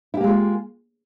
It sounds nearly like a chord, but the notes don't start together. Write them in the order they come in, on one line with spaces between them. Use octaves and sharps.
E4 G4 A#3 G#3 F4